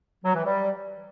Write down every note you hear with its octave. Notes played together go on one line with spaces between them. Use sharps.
F#3
E3
G3